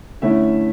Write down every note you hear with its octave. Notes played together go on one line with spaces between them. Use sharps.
D3 A3 C#4 E4 E5